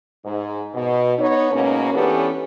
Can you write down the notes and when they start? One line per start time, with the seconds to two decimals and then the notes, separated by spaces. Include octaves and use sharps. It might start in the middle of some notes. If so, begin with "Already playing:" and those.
0.25 G#2
0.74 B2
1.18 B3 D#4 C#5
1.52 G#2 B2 A#3 C#4
1.94 E3 B3 C#4 D4 G4 A4